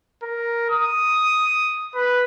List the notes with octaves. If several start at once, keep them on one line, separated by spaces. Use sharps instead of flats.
A#4
D#6
B4